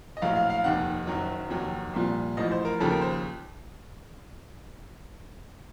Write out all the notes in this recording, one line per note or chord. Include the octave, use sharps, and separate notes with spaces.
D#5
A#1 A2 F#3 F5
F5
F5
F1 D#2 D#3 F#5
F#1 F#2 D#3 F#3
F1 D#2 D#3 F#3
C2 A#2 F3
A1 A2 F3 D#5
C5
A#4
D#2 C#3 F3 A4
A#4
C5